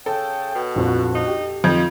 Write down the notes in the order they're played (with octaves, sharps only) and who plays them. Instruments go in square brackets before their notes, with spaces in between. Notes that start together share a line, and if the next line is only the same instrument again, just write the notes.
[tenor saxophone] C#3 [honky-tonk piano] A4 [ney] G5
[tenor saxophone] B2
[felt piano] A#1 F2 [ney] F#4
[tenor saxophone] D#4
[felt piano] G4
[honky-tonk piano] F2 [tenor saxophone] D#4 [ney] F4 [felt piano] G6 G#6